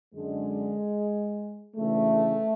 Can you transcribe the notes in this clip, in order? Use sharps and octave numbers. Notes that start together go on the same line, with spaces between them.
F#2 D3 G#3
D2 C#3 E3 A3